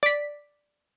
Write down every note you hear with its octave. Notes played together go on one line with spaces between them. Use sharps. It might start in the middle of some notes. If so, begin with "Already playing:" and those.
D5 B6